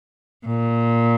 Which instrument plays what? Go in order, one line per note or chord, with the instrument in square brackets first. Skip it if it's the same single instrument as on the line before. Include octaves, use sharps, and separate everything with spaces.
[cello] A#2